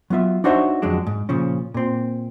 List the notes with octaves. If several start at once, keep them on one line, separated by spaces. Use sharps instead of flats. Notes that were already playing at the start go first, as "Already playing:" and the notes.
F#3 B3 F4 E5
D4 D#4 F#4 C5 C#5 E5
F2 D3 F#3 G#3 D4
G#2
A#2 C#3 F3 C#4
A#2 C4